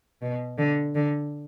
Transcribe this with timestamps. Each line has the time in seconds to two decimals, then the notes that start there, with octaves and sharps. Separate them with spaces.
0.22 B2
0.58 D3
0.95 D3